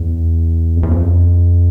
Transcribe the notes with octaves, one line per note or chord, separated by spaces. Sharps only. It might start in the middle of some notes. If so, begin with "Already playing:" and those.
Already playing: E2
F2
E2
F2